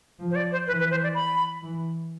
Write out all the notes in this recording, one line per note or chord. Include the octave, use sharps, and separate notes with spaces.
F3
C5
D5
C5
E3 B4
B4
C5
D5
B5
E3